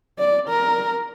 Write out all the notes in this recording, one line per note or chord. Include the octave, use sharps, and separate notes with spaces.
D5
A#4